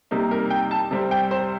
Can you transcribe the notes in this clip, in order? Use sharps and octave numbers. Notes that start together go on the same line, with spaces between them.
C3 G3 A#3 D#4
A#4
G5
A5
C3 G3 C4
G5
C5